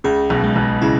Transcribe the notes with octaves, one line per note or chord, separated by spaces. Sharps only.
C#2 C#3 G#4
B1 B2
G#3
B1 B2
C#3 E4